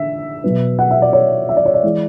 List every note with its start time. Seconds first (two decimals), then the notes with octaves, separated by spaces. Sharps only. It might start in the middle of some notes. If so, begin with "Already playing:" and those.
Already playing: D3 E5
0.44 B2 F#3 B3
0.79 F#5
0.91 E5
1.02 D5
1.13 C#5
1.49 E5
1.57 D5
1.65 C#5
1.74 D5
1.84 E3 G#3